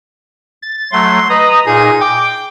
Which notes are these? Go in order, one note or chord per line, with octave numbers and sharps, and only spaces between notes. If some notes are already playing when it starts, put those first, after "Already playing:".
A6
F#3 A3 C6
B4 D#5 A#5 D#6
A#2 D#4 G#4
G5 D6